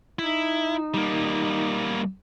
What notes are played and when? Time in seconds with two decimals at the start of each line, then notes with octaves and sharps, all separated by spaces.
0.19 D#4 E4
0.94 G3 A#3